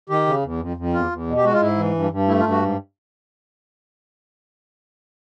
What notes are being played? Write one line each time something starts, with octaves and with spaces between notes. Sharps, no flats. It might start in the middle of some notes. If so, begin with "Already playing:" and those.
D#3 G4
C#3
E2
F2
F2
E2 F4
E2
B2
G4
G#3 F#4
F4
G#2 E4
E3
G2
G2
A3 E4
F4
G2
F#4
G#2